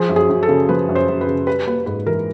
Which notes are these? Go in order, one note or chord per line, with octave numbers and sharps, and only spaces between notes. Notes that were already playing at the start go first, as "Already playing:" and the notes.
Already playing: F3 G#4
F#2
G#4
F#2
A4
C#3
F3 B4
F#2
C5
F#2
B4
C#3
G3 B4
A#3 B4
G#2 B4
E3 A#4